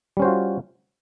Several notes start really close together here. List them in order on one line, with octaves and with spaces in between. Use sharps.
G3 C#4 C5 F#4 F4